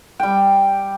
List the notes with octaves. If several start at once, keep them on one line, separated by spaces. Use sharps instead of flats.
G3 G5